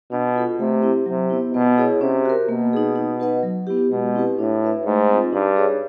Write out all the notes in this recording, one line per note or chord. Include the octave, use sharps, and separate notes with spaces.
B2 D4
F4 A4
C3 A3
C4 E4 G4
C3 F#3
B3 E4
B2 B3
E4 G#4 C#5
C3 C#4
F#4 A#4
B2 A#3
D#4 G#4
D#4
F#4 B4 D#5 F#5
F#3
B3 E4 G4
B2 G#3
C4 E4 G4 B4
A2 D4
F#4 B4 E5
G#2 A3
C4 F4
G2 D#4
G#4 C#5